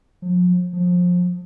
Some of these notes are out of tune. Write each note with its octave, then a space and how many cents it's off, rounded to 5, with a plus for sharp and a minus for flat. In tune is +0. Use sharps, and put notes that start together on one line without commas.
F3 +45
F3 +25